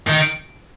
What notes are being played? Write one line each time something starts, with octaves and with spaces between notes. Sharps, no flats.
D#3